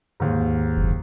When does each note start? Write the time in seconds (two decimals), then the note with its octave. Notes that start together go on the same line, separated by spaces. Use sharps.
0.20 D#2 G#2
0.77 F#1